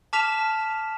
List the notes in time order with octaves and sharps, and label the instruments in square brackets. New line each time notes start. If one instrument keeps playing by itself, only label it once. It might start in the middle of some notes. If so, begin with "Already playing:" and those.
[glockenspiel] A5 D6 F6 B6 E7 F7